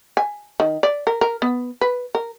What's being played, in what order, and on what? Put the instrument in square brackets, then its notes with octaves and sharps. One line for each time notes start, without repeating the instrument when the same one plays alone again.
[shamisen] G#5
D#3
D5
A#4
A#4
B3
B4
A#4